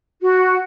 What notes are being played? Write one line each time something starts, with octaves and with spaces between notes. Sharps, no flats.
F#4